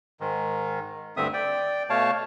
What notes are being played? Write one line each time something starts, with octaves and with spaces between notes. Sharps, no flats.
G#2 D#3
D2 G2 D3 C4 E5 D#6
D5 G5
B2 A3 C#5 F5 A5